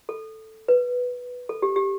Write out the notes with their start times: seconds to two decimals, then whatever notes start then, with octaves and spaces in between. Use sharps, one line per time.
0.09 A4
0.68 B4
1.49 A4
1.62 G4
1.76 G4